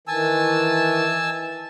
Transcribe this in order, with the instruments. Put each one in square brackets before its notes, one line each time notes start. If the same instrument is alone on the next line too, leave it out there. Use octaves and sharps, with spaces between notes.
[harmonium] D#3 E3 [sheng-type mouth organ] G#5 A5 E6